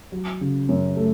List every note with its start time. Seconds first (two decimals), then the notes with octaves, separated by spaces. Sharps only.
0.12 F#3
0.41 C#3
0.69 F#2
0.96 A3